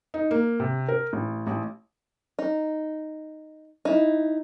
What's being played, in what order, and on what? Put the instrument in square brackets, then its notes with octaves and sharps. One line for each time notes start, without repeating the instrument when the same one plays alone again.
[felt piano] D#4
A#3
C3
A#4
A1
A1
[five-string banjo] D#4
D#4 E4